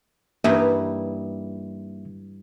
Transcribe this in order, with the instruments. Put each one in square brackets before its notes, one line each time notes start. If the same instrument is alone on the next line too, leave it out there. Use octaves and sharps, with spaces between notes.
[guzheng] G2 E3 D#4 [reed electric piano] A#3 E5